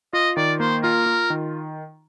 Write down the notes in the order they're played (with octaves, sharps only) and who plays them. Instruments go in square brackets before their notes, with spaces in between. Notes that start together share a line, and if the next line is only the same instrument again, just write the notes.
[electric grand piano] F4 [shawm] D#5
[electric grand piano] D#3 [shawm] D5
[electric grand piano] A#3 [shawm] C5
[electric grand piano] F4 [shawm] A#4
[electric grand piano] F4
D#3